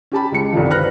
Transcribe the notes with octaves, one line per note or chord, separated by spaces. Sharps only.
C#4 G4 A5 B5
C#2 G#3 C#4 C#7
C2 G2 D3 D#3 F3
B4 C5 B5 F6 F#6 A#6